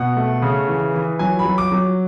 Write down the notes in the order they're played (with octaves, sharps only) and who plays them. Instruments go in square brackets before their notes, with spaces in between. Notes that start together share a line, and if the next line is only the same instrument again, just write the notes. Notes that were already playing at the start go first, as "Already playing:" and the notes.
Already playing: [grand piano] B2 F#5
A3
C#3
E3
E3
F#3 G#5
B5
F#3
D6
F#3